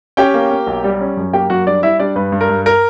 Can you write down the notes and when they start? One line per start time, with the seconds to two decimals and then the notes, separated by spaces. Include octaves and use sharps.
0.17 C#4 G4 G5
0.34 A#3
0.51 A#3
0.67 B1
0.84 G3
1.01 C#4
1.17 F#2
1.33 A#3 G4 G5
1.50 F#2 F#4 F#5
1.67 G3 D4 D5
1.82 G3 E4 E5
1.99 G3 D4 D5
2.16 G2 B4
2.32 G2
2.41 A#4
2.49 G2
2.66 A#4